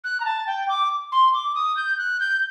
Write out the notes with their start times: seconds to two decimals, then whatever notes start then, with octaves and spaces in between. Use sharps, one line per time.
0.04 F#6
0.20 A#5
0.25 A5
0.47 G5
0.69 D6
1.12 C6
1.34 D6
1.55 D#6
1.77 G6
1.98 F#6
2.20 G6